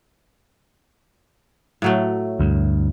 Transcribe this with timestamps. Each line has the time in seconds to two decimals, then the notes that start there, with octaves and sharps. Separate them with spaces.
1.82 A2 F#3 A3
2.39 D2 G2